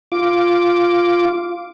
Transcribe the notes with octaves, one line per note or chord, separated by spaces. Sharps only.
F4 D6